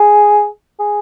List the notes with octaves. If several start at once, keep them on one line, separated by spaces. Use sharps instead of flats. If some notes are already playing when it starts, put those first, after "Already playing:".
Already playing: G#4
G#4